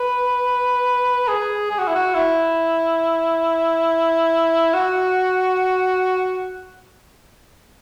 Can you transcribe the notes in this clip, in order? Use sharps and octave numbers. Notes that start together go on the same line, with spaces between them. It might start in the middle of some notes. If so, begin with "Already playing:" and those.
Already playing: B4
G#4
G#4
F#4
E4
F#4
E4
F#4